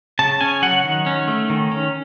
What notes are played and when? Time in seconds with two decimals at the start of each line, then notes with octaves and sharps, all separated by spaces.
0.19 C#3 A5
0.41 C#4 G#5
0.62 F#3 F#5
0.84 D#3
1.06 C#4
1.28 A3
1.50 D#3
1.72 C#4